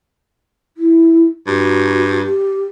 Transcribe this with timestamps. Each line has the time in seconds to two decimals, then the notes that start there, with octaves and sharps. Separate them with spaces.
0.77 E4
1.47 G2 F#4
2.23 G4